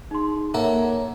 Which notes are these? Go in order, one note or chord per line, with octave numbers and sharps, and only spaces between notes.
D#4 G#4 C6
A#3 A4 A#4 C#5 E5 F#5 A#5